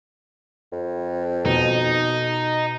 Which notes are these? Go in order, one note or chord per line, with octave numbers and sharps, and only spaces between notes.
F2
B2 D#4